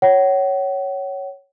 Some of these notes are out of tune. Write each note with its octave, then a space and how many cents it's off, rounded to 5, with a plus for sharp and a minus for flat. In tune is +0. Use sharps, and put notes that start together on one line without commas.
C#5 +0 F#5 +35